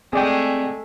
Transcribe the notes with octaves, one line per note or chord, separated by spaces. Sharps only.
G#3 A3 C4 G#4 D5 G5